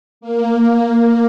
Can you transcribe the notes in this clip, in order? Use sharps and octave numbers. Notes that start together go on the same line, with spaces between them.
A#3